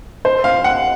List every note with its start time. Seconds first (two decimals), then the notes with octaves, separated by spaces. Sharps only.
0.25 C5
0.44 F5
0.64 F#5